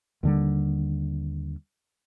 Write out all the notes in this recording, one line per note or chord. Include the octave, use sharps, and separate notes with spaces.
D#2 D3 G3